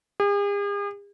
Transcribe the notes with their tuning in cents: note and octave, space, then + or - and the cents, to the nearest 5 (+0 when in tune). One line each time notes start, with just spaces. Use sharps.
G#4 -45